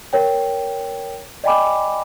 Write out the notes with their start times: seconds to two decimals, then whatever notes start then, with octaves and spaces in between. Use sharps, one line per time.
0.13 A#4 C#5 G5
1.44 D5 D#5 G5 G#5 B5 D6